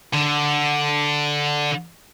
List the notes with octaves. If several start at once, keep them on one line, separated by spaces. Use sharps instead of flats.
D3